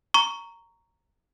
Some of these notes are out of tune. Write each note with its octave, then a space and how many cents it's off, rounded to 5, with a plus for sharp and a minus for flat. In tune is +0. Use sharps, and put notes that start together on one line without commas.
A#5 -10 C#6 +10